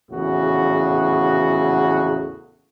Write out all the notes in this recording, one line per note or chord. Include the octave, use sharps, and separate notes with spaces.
A#1 E2 A2 C#3 F#4